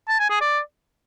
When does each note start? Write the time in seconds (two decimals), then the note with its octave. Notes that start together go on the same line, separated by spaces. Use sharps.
0.09 A5
0.19 G#5
0.30 G#4
0.41 D5